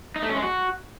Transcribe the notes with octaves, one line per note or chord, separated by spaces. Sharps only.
D#4
A3
C#4
G#3
F#4